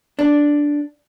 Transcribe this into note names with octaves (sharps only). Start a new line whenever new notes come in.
D4